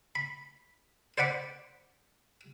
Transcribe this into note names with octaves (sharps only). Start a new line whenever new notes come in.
B5
C5 D5 F#5 B5 D6